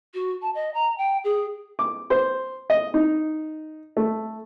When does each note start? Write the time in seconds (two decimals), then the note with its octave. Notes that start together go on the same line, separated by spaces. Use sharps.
0.14 F#4
0.42 A5
0.55 D#5
0.74 A#5
0.98 G5
1.24 G#4
1.79 D6
2.10 C5
2.70 D#5
2.94 D#4
3.97 A3